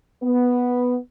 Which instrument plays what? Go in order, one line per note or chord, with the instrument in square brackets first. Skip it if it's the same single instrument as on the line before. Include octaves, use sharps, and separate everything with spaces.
[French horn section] B3